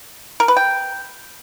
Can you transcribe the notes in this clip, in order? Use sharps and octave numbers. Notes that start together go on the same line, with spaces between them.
A#4
B4
G5